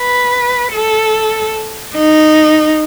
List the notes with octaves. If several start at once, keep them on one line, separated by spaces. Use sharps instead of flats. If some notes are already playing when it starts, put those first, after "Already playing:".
Already playing: B4
A4
D#4